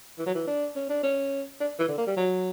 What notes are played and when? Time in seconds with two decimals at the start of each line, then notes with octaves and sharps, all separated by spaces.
0.18 E3
0.26 F#3
0.35 E3
0.47 D4
0.76 C#4
0.90 D4
1.03 C#4
1.61 D4
1.79 E3
1.89 D3
1.98 A#3
2.07 G3
2.17 F#3